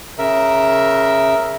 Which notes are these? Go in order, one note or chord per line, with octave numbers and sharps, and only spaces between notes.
C#3 A#4 E5